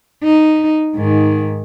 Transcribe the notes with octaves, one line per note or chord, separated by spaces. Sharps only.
D#4
G#2 D#3